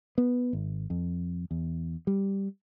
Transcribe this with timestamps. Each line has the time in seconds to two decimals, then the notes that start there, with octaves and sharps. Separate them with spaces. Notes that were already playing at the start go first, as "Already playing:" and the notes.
0.18 B3
0.53 G#1
0.90 F2
1.51 E2
2.07 G3